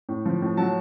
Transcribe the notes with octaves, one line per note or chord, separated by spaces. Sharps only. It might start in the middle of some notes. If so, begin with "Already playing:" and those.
A2
F3
A2
F#3 A5